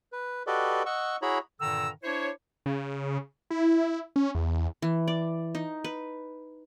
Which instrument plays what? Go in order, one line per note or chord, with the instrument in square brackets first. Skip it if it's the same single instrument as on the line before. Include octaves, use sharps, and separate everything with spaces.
[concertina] B4
F#4 G4 A4 B4 D5 D#5
D#5 F#5 C#6 E6
E4 F#4 G#4 C#5 A#5 B5
[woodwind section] G2 A#2 D3 D#3 A#5 E6
D4 E4 C5 C#5
[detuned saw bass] C#3
E4
C#4
E2
[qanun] E3
D5
D#4
B4